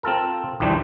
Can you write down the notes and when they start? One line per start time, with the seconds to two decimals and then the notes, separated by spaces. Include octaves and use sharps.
0.03 C4 F4 A4 A#4
0.60 A#1 D#2 E3 G3 D4 C5